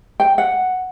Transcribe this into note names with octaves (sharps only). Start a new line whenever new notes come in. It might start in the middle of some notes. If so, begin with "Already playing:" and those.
G5
F#5